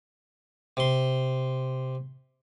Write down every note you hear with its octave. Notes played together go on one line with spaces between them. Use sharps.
C3 C6